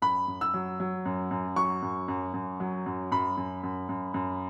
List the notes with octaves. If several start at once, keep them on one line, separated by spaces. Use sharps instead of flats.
F#2 B5
F#2
E6
F#3
F#3
F#2
F#2
F#3 C#6
F#2
F#2
F#2
F#3
F#2
F#2 B5
F#2
F#2
F#2
F#2